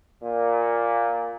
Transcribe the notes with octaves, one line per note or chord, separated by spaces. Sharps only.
A#2